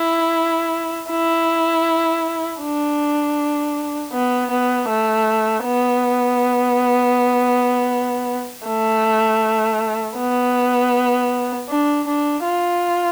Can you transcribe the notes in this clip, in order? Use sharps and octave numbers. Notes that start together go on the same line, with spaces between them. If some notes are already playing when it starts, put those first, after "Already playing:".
Already playing: E4
E4
D4
B3
B3
A3
B3
A3
B3
D4
D4
F4